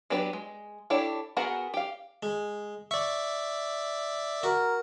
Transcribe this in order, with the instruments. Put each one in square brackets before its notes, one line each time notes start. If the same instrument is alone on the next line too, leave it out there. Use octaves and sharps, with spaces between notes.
[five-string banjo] F#3 B3 D4 G4 B4
G#3
D4 E4 G4 A4 C#5
B3 F#4 G#4 A#4 F#5
G4 F5
[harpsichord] G#3
[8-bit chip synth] D5 E5 [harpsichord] C#6
[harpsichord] F#4 [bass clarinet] A#4